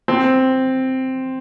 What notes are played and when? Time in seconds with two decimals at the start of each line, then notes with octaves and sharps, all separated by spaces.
0.08 C4